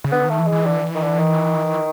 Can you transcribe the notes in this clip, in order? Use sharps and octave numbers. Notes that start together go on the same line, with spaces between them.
C#3
D3 B3
D#3 A3
E3
G#3
E3
D3
D#3
D3
D#3